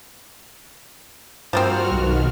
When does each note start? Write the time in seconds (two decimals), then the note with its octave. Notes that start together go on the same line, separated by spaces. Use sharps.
1.53 G2 F3 A#3 C4 F#4 F6
1.91 B1 B2 D#3